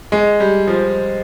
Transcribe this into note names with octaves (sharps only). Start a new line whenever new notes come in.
G#3
G3
F3